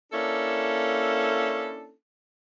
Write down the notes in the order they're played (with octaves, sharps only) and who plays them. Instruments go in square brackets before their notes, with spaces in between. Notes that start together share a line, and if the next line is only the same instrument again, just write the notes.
[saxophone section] A#3 C#4 D4 E4 A4